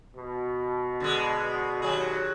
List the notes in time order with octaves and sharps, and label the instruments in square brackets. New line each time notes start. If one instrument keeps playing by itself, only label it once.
[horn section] B2
[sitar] D3 G#3
D#2 F#3 G#4